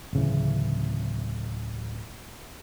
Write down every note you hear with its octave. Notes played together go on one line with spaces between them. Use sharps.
D1 C#3 E3